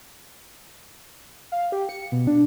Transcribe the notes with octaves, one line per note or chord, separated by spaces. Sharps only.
F5
G4
C#7
B2
D4